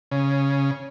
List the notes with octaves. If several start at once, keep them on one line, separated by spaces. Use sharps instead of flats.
C#3